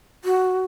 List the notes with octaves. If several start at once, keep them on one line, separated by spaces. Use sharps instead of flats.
F#4